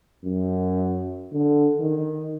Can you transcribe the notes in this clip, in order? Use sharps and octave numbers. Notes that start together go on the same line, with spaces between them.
F#2
D3
D#3